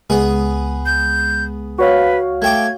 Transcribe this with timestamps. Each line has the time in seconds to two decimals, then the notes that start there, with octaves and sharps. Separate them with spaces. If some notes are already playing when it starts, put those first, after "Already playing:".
0.10 C#2 G#3 B3 G#4
0.86 G6
1.78 F#4 B4 C#5 F5
2.42 A3 G5 D6 G#6